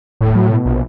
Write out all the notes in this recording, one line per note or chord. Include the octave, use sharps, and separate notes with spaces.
D#1 A2
F#3
B2
A#1